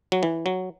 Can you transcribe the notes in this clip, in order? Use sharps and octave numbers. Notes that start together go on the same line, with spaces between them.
F#3
E3
F#3